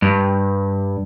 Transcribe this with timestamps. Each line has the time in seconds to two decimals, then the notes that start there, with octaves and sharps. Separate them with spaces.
0.02 G2